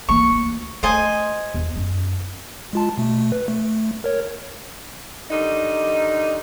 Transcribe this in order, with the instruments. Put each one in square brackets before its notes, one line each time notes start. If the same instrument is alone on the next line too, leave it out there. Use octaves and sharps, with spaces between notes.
[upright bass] E3 A#3 [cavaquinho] C#6
[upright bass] D2
[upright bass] A3 [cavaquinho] C5 D#5 G#5
[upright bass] E2
F#2
[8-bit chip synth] G#3 F4 A5
B2 A3
B4
A3
A#4 C#5
[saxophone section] D3 D#3 G3 D#4